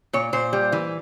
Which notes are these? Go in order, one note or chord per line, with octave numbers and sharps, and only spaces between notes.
A#2 C#5
A#2 C5
G3
E3